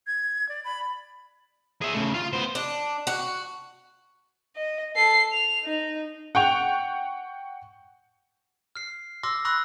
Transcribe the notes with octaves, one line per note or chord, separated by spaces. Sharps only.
G#6
D5
B5
G#4 E5
C#3 A3
F4 F5
B3 C5
D4
F#4
D#5
A4 C7
F7
D#4
F#5 G5 C#6 F7
F6 C7
C6 D6 E6 F6 A#6
B5 C#6 D#6 E6 F#6 A#6